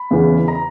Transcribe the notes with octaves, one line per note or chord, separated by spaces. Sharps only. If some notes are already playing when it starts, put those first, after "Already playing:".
Already playing: B5
E2 C#3 E3
A#5